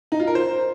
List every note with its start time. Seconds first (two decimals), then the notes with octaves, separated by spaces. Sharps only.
0.12 D#4
0.20 F4
0.27 A#4
0.35 C5